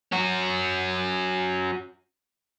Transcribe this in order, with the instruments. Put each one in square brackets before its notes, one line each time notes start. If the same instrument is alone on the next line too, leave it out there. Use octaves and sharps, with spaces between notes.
[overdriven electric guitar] C#4 F#4